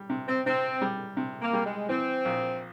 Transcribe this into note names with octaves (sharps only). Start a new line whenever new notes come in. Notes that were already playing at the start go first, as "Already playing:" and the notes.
Already playing: G3
C3
C4
C3 C4
G3
C3
A#3
G3
G#3
E3 C4
A#1